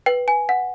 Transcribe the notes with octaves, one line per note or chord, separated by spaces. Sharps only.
B4 G5
G#5
F#5